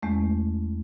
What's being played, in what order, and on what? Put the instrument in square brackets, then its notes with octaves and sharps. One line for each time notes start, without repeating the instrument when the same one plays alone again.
[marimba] E2 G#3 A3 C#4